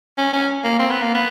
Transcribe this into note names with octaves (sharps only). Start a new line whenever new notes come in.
C#4
C#4
A#3
C4
B3
A#3
B3